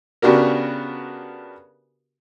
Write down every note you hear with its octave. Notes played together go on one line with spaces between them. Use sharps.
C#3 B3 D4 F#4 G4 A#4